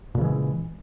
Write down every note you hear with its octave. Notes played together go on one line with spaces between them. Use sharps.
A#2 C#3 E3 G#3